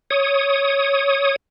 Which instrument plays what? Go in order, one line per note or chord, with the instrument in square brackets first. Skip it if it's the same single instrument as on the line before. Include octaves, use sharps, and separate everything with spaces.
[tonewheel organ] C#5 D#6